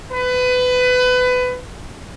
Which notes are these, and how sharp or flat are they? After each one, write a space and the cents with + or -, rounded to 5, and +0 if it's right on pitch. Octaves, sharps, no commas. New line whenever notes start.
B4 +25